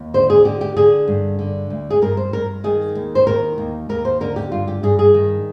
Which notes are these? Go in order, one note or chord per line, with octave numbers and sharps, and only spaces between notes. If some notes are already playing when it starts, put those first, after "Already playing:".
Already playing: D#2
D3 C5
G#4
D3 G4
G4
D3 G#4
G2
D3
D2
G#4
G2 A#4
C5
G2 A#4
D#3 G#4
D#2
C5
D#3 A#4
D#2
D#2 A#4
C5
D3 A#4
G4
G2 F4
G4
G2 G#4
G#4
D#3